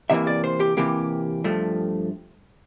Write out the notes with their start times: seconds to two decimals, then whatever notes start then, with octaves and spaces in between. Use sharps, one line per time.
0.10 C3 E3 A#3 E5
0.27 D5
0.44 C5
0.60 G4
0.77 C3 E3 A#3 G4
1.44 G2 F3 A3